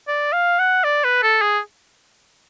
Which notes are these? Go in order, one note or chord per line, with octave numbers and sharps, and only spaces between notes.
D5
F5
F#5
D5
B4
A4
G#4